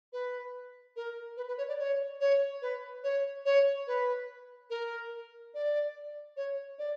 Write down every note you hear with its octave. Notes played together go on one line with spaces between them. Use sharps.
B4
A#4
B4
B4
C#5
D5
C#5
C#5
B4
C#5
C#5
B4
A#4
D5
C#5
D5